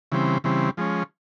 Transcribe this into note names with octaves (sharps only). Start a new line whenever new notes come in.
C#3 E3 G3 C4
C#3 E3 G3 C4
F3 G#3 C#4